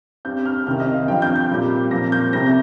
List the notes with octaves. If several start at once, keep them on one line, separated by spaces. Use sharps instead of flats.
G2 G3 C4 G6
F6
C2 C3 D#3 C4 F6
D#5
F5
G2 F3 C4 G5
G6
G6
A#2 G3 C4
A#2 F3 C4 A#6
G6
C2 C3 G3 C4 A#6